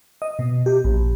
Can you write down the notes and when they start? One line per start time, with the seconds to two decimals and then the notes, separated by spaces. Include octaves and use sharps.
0.22 D#5
0.39 B2
0.66 G4
0.84 A#1